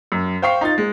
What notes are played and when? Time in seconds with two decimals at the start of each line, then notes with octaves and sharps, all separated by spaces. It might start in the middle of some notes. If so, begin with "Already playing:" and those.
0.12 F#2
0.42 C5 F5 G5 C#6 C7
0.61 D#4 F4 A6
0.78 G#3